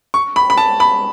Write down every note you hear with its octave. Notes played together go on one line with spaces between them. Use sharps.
C#6
B5
B5
A5
B5